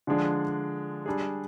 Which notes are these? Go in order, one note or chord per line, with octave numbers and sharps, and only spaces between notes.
D3 F3 G#3 D4
G3 D4 G#4